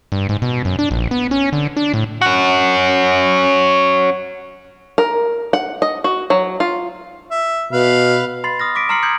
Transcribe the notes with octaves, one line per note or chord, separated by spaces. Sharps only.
G2
G#2
B2
F#2
D4
A#1
B3
C#4
D3
D4
A2
C#4 F#4
A#4
F#5
D#5
F#4
F#3
F4
E5
B2 B4 F5
B5 C6 A6 C7
D#6 F6 A#6
D6 B6 D7
A#5 C6 F6 C7 C#7 F#7
D#6 F6 G6 G#6 C#7 F#7